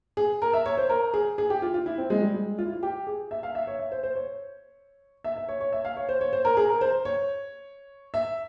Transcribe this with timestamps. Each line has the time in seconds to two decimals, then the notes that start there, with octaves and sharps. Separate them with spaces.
0.17 G#4
0.42 A#4
0.53 E5
0.66 C#5
0.78 C5
0.89 A#4
1.14 G#4
1.38 G#4
1.50 G4
1.62 F4
1.74 F4
1.86 E4
1.98 C4
2.10 G#3
2.22 G3
2.34 G#3
2.58 F4
2.66 E4
2.73 F4
2.83 G4
3.07 G#4
3.31 E5
3.43 F5
3.55 E5
3.67 C#5
3.80 E5
3.92 C5
4.03 C5
4.16 C#5
5.24 E5
5.36 E5
5.48 C#5
5.60 C#5
5.73 E5
5.85 F5
5.97 C#5
6.09 C5
6.21 C#5
6.33 C5
6.45 A#4
6.57 G#4
6.69 A#4
6.81 C5
7.05 C#5
8.14 E5